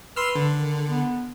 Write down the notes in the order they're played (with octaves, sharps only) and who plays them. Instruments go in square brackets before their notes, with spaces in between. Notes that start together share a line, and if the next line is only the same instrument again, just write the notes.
[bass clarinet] B4 [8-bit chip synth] C6 E6 F6
[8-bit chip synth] D3
[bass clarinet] D#3
B3